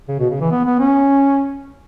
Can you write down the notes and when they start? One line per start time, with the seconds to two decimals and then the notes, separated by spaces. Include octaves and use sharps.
0.08 C#3
0.19 B2
0.30 C#3
0.40 E3
0.51 B3
0.65 B3
0.79 C#4